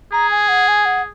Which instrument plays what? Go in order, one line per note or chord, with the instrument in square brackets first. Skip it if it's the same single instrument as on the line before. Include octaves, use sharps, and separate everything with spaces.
[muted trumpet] G#4 [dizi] A#5
[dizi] G#5
F#5
G#5
F#5